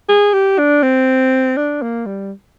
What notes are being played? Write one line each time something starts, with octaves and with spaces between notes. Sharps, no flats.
G#4
G4
D4
C4
D4
A#3
G3